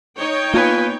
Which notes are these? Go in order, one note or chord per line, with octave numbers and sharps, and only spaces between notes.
D#4 C#5 G5
A#3 B3 F4 B4 G#5